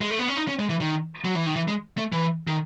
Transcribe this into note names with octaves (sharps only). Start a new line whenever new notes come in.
G#3
A3
B3
C#4
D#4
C#4
G#3
E3
D#3
F#3
E3
D#3
E3
G#3
A3
E3
D#3